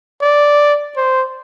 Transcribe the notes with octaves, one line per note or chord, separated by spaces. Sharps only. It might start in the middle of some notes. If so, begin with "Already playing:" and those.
D5
C5